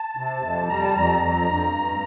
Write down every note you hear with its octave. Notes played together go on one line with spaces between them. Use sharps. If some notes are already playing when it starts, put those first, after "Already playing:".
Already playing: A5
C3
F2
G3 A#5
A5
F2 A#5
F2
G2
G2